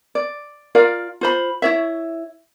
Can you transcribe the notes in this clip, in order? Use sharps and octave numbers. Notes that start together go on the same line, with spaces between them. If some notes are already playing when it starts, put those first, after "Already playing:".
D5
F4 A#4 D5 F5
F4 C5 B5
E4 C#5 E5